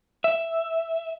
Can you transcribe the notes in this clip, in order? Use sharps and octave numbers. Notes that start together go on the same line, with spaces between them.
E5